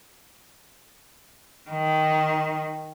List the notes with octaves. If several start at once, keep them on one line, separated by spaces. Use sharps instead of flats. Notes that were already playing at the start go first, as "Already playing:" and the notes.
D#3